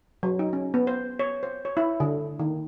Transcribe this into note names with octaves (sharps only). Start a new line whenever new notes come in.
F#3
D#4
C#4
B3
C5
C#5
C5
C#5
E4
D3
D#3